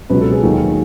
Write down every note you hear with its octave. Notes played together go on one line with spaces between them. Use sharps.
C#2 B2 F#3 B4
A4
G#4
D#2 D#3 F#3